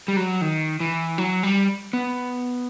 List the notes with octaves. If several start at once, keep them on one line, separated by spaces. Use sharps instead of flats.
G3
F#3
D#3
E3
F#3
G3
B3